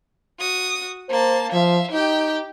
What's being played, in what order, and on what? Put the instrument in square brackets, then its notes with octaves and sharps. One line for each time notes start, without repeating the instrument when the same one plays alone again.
[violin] F#4 D#6
[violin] A#3 A5 [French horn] C5
[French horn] F3 [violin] E5 F5
[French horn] D#4 [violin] G4 G5